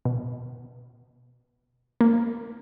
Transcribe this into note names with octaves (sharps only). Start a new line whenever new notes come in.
B2
A#3